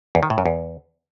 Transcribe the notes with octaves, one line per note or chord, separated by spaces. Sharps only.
E2
D#3
A2
F#2
E2